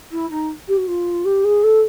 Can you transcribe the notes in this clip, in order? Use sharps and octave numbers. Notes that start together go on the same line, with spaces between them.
E4
D#4
G4
F#4
F4
G4
G#4
A4